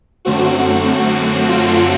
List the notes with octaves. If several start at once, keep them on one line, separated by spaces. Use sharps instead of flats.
F#2 D3 F#3 A3 C4 F#4
F4